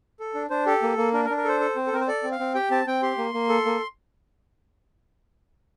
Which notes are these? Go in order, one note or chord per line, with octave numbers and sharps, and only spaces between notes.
A4
D4
D4 C5
G4 A4
A#3
A#3
D4 A#4
A#4
D4
A#4
A4 C5
A4
C4
A4
C4 A#4
C5
A4 D5
C4
F5
C4
G4 G5
C4 A5
C4 G5
G4 C6
A#3
A#3
A4
A#3